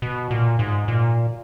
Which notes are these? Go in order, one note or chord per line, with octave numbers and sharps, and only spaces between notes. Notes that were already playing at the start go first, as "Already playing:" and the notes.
B2
A#2
G#2
A#2